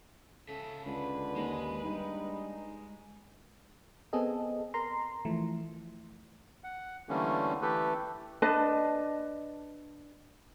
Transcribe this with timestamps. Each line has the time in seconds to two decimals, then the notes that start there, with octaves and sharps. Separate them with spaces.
0.49 C#3 A4 E5
0.86 C#2 D3 B4
1.36 D#2 G#3
1.85 G2 D#4
4.13 B3 C4 G#4 A4 D#5
4.74 A#4 A#5 C6
5.25 E3 F3 A3
6.64 F#5
7.09 D3 E3 G3 A3 A#3 C#4
7.62 E3 A3 G4 A4 B4
8.42 D4 B4 D#5 A5